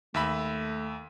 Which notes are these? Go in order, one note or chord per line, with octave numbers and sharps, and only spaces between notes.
D#2 A3 E5 B5